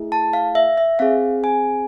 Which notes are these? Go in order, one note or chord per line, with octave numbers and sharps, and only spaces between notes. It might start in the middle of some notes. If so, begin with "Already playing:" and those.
Already playing: A3 E4 G#4
A5
F5
E5
E5
C4 G#4 F5
G#5